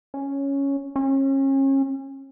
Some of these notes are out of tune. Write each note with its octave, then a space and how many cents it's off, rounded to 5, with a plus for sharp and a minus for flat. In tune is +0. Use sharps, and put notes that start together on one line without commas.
C#4 +0
C#4 -35